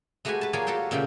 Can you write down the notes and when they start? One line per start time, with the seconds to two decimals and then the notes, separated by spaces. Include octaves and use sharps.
0.25 G#3 A3 F#4 G4 B4 G#5
0.41 B4 A5
0.53 A#3 F4 G#4 C#5 D5 G#5
0.67 F#4 G4 A4 F5 G5
0.91 A#2 C#3 A3 F4 G4 G5